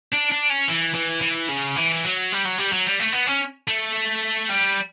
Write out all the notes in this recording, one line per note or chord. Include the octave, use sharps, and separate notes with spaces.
D4
D4
C#4
E3
E3
E3
C#3
E3
F#3
G3
F#3
G3
F#3
G3
A3
B3
C#4
A3
G3